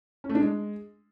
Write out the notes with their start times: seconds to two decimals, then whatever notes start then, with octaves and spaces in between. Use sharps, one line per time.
0.24 C#4
0.29 A3
0.35 D4
0.40 G#3